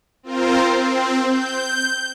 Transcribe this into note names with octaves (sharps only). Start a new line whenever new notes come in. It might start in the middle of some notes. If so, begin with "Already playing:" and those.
C4 F4 A#4 C5
C4
G6